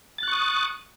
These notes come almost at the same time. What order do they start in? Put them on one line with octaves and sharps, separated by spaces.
A6 F#6 C#6 D#6